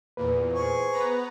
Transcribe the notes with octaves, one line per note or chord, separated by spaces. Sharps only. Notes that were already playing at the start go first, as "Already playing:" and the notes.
E2 A#2 B4
G#4 C5 C#6
B3 B4 A#5